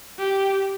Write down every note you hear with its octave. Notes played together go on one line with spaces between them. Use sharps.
G4